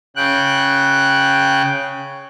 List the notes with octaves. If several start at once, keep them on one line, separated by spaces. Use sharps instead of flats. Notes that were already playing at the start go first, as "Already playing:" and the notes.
C#3 G5 F#6